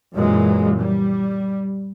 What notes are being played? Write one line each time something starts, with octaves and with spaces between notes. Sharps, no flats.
F#2 A#2 E3 G#3
G3